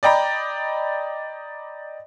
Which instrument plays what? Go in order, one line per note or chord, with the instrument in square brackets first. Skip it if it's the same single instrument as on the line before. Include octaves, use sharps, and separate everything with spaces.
[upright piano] D5 D#5 G5 A#5 B5